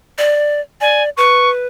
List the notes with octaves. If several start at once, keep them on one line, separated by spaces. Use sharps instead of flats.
D5
D5 G#5
B4 C#6